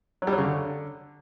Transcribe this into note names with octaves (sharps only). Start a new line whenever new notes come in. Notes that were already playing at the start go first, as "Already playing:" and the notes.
F#3
G3
F#3
C#3
D3